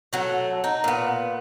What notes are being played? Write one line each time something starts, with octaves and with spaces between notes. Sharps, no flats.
F#3 A3
D#4
A#2 B3